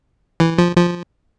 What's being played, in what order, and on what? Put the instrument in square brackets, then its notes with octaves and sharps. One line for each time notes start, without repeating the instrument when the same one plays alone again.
[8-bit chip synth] E3
F3
F3